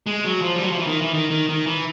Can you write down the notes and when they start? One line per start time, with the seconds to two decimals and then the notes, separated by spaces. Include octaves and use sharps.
0.07 G#3
0.24 F#3
0.42 F3
0.56 G3
0.64 F#3
0.72 F3
0.79 E3
0.87 D#3
1.02 E3
1.14 D#3
1.31 D#3
1.49 D#3
1.67 E3